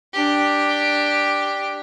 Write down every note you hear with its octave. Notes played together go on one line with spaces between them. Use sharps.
D4 G4